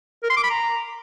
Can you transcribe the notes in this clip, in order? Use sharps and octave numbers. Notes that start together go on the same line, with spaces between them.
A#4
C6
D6
B5
A#5